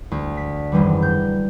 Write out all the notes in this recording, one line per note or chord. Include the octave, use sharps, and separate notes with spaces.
D2
B6
G#1 F#2 E3 G3
G6